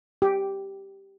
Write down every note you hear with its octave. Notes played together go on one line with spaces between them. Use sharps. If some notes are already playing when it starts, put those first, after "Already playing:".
G4